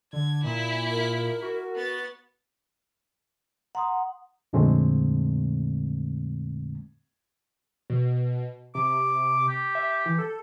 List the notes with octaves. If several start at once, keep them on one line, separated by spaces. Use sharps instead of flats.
D3 G#6
A#2 E4
A#4
F#4
B3 A6
F#5 A#5 C6 D#6
F2 A#2 D3 G#3 A3 C4
B2
C3 D6
G4
E5
E3
A4